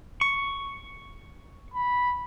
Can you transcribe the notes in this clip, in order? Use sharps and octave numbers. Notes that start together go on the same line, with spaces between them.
C#6
B5